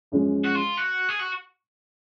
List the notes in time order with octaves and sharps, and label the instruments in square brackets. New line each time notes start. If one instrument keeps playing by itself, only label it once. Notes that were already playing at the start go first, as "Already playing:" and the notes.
[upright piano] F#2 F3 G#3 C#4 G#4
[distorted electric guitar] F#4
F4
F#4
G#4
F#4